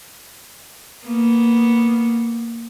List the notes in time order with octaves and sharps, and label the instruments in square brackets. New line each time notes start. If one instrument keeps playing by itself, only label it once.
[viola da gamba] A#3 B3